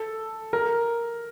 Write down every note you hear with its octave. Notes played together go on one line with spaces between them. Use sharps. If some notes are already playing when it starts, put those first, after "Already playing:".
Already playing: A4
A#4